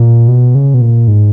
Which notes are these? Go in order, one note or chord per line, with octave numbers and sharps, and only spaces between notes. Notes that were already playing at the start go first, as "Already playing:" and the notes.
Already playing: A#2
B2
C#3
B2
A#2
G#2